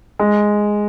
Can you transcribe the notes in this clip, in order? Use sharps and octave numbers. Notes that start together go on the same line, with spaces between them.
G#3